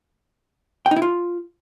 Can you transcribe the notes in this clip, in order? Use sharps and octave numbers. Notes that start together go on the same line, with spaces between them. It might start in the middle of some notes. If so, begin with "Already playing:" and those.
G5
D#4
E4
F4